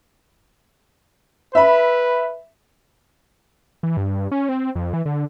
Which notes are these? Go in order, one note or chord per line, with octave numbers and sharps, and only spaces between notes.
B4 E5 B5
E3
G2
C#4
C4
F2
E3
D3